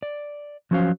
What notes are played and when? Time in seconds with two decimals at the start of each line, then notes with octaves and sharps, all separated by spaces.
0.03 D5
0.71 F3 F#3 C#4 F#4 C5 F5